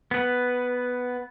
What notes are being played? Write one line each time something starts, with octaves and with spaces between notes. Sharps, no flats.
B3 B4